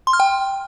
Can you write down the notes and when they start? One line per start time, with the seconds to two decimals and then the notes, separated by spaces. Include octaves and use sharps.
0.07 C6
0.13 F6
0.20 G5